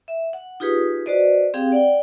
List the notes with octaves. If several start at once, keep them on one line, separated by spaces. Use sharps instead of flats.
E5
F#5
D#4 F4 G4 G#4 B4 D#6
F#4 B4 C5 D5 D#5
C4 G4 G#4 F5 G5
D5 F#5 G5